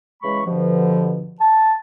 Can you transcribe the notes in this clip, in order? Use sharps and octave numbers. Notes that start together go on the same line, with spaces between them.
C#3 E3 G#3 B5 C#6
G2 B2 D3 F3
A5